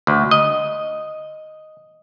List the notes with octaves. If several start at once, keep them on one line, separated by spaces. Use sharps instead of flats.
D2
D#5